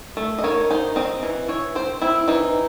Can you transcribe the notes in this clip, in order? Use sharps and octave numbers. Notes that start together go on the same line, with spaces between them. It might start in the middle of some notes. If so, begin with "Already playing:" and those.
A3
D#5
D#3 C#5
D#4 C5
C4 D#5
E3
E3 C#5
C4 C5
C4 E4
E3 D#4